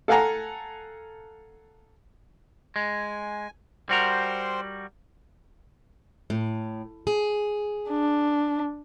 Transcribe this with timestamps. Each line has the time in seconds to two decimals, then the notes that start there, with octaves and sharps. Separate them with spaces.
0.08 A4 F5 F#5 G#5 A#5
2.76 G#3 G#5
3.89 G3 F#4 A#4 C5 G5 C6
6.30 A2
7.07 G#4
7.90 D4